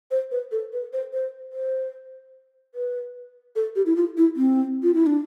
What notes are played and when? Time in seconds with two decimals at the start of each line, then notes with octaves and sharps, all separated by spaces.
0.11 C5
0.31 B4
0.52 A4
0.73 B4
0.93 C5
1.13 C5
1.53 C5
2.75 B4
3.56 A4
3.76 G4
3.86 E4
3.96 F4
4.17 E4
4.36 C4
4.83 F4
4.94 E4
5.06 D4